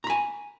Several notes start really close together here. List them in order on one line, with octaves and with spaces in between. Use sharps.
A#5 B5 G#5